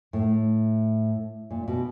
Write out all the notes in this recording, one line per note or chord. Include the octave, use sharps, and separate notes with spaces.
A2
A#2
B2